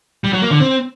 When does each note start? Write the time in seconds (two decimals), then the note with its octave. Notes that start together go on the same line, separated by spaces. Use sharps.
0.24 G3
0.33 F#3
0.42 A#3
0.51 D3
0.60 C4